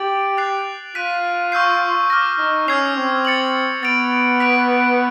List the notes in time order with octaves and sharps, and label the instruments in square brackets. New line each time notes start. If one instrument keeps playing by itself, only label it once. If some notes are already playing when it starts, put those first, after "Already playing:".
Already playing: [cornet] G4 [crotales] A6 D7 F#7
[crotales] F#6 A6 C7 F7
[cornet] F4 [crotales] F#6 B6 D#7
[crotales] C#6 E6 G6 C7
D6 F6 A#6
[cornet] D#4
[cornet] C#4 [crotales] E6 G#6 C7 F7
[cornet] C4
[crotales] A6 C#7 F#7
[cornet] B3 [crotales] A6 D7 F7
[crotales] F#6 B6 D7 F7